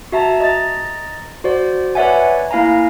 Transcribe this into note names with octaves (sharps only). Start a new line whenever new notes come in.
F#4 E5 A5 A#5
D#5 A#5 A6
F#4 C5 D5
B4 C#5 D5 E5 F#5 G#5
A#3 E4 F5 G#5 A#5